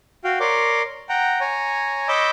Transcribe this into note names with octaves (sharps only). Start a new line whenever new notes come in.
F#4 F5 G5
A#4 C#5 D5 C6 D6
F#5 G5 A#5
C#5 G#5 A#5
C#5 D#5 B5 D6 E6 G6